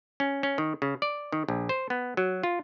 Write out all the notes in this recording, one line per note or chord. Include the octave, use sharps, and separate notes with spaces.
C#4
C#4
D#3
C#3
D5
D#3
A#1
C5
B3
F#3
F4